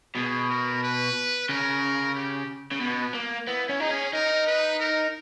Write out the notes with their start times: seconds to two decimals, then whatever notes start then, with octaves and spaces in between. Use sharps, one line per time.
0.16 B2 G#4
0.50 A#4
0.82 B4
1.49 C#3 A#4
2.15 G4
2.71 C#3
2.81 B2 B3
3.14 A#3
3.47 B3 E4
3.69 C#4
3.80 D#4 G#4
3.91 C#4
4.13 D#4 A#4
4.46 B4
4.79 A#4